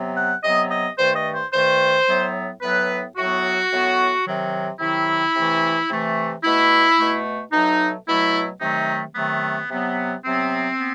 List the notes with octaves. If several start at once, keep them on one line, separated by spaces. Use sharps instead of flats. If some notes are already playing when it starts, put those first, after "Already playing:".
Already playing: C3 F#3 B3
F#5
C3 F#3 B3 D#5
D#5
G2 D#3 A3 C5
D#5
C5
G2 D#3 A3 C5
A2 F#3 B3
A2 F#3 B3 B4
A2 F#3 B3 F#4
A2 F#3 B3
C3 D#3 F#3
C3 D#3 F#3 E4
C3 E3 A3
C3 E3 A3
B2 A3 E4
B2 A3
B2 F#3 A3 D#4
B2 F#3 A3 E4
C3 D#3 F#3 A3 D#4
C3 D#3 F#3 A3 B3
C3 F#3 B3
C3 F#3 B3 C4
B3